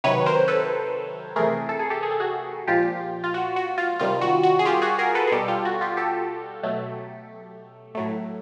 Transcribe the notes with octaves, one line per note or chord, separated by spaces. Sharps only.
C3 D#3 F#3 B4 C#5
A#4 C5
A4 B4
C3 E3 A3 G#4 A#4
A4
G#4
G4 A4
G#4
A4
F#4 G#4
A#2 F3 G#3 F4 G4
F4
F#4
F#4
F4
C3 D#3 G3 F4
F#4
F#4
G#4
F4 G4
F#4 G#4
G#4 A#4
A4 B4
G#4
B2 G3 G4 A4
F4 G4
F#4
F4 G4
G4 A4
B2 F#3 A3
A2 F#3 A3